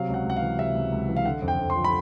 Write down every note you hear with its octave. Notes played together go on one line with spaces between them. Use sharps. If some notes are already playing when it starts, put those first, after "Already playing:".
Already playing: C3 F#3 F5
C#2
F#5
C#2 F#5
E3 F5
C3 E5
C#2
C#2
E3
F5
D3 F#5
F2
G5
F2
C6
F3
B5